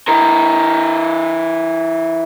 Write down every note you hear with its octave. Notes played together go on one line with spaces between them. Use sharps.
E3 A#4